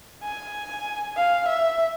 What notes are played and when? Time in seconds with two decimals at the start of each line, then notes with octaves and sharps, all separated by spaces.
0.23 G#5
1.17 F5
1.49 E5